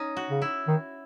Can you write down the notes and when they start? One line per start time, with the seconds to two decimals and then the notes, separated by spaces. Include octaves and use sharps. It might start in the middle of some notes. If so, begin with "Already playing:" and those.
Already playing: C#4 D#4
0.17 F#4
0.30 C#3
0.42 E4
0.68 D#3